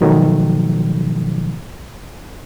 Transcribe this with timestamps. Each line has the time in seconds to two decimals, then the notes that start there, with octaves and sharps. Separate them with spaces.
0.01 G#2 B2 D#3 F3 F#3 A3